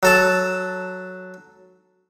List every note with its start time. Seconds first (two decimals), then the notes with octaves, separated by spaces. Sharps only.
0.03 F#3 A4 A5